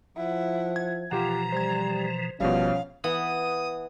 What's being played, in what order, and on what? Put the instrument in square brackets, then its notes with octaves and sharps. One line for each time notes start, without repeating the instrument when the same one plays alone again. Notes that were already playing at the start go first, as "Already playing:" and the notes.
[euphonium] F3 [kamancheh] E4 F#5
[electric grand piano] G#6
[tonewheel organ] B2 E3 F3 [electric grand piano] F4 G4 F#5 [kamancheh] A#5
[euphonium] G3 [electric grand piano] C5 G#6
[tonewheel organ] G#1 [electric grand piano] B2 F3 G3 [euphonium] C#4 [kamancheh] F5
[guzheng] E3 B3 [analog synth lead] D#6